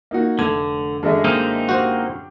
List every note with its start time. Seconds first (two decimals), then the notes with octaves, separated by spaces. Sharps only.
0.11 A#3 D#4 F#4
0.39 F1 D3 A3 G#6
1.03 F#2 D3 G#3 A4 D#5 E5
1.25 A#3 C4 D#4
1.69 F#4 G4 C5